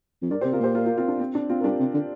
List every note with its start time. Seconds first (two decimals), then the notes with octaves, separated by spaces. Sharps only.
0.22 F2
0.30 G2 A#4 D5
0.41 C3 G4 C5
0.52 C3 F4 A#4
0.60 A#2 G4 C5
0.75 F4 A#4
0.86 F4 A#4
0.97 C4 F4
1.08 D4
1.20 C4
1.35 D4
1.49 C4 F4
1.60 A#4
1.64 G2 D4 G4
1.80 C3
1.94 D3